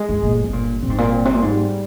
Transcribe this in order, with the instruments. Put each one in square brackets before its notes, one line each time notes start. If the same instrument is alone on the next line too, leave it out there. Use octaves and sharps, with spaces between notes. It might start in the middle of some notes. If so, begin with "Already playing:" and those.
Already playing: [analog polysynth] G#3
[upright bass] G2
[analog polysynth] G1 [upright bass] A#2
[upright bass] C3
[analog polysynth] G1 [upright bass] A#2
[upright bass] A#2 [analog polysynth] C4
[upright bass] G#2
A#2
[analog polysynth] C4
[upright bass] C3
A#2
[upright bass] G#2 [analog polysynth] G3